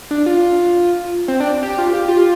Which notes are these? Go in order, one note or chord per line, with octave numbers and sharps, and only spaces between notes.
D4
F4
C4
D4
G4
F4
G4
F4